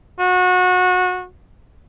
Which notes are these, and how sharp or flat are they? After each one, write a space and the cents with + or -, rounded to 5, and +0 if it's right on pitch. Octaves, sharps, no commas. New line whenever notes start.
F#4 -25